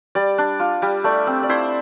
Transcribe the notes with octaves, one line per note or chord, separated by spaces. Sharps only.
G3 D5
D4
F4
G3
A3 D5
C4
D5
E4 C5